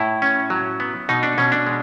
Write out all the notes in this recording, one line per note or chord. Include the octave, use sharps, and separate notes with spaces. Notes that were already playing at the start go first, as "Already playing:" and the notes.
Already playing: A2 E4
C#4
F#3
B3
B2 D#4
D4
B2 C#4
D4
G#3